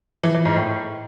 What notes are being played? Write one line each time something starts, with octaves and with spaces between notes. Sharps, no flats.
E3
E3
G#2
A2